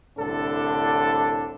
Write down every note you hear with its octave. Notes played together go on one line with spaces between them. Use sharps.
C2 A2 D3 D4 A4